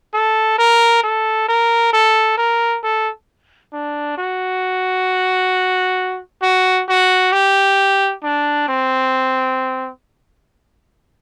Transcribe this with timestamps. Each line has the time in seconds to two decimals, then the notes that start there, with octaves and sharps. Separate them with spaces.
0.14 A4
0.58 A#4
1.04 A4
1.48 A#4
1.93 A4
2.37 A#4
2.83 A4
3.73 D4
4.18 F#4
6.42 F#4
6.88 F#4
7.32 G4
8.23 D4
8.68 C4